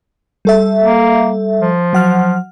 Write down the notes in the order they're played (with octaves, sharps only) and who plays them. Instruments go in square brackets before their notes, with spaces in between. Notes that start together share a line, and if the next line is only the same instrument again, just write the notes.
[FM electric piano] G3 A4 E5
[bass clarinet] A#3
F3
[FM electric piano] F#3 F#5 F6